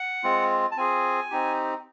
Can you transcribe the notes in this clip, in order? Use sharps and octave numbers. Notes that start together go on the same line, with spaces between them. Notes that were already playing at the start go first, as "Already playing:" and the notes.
Already playing: F#5
G#3 C4 F4
A5
C4 F4 G#4 G#5
C4 D#4 G4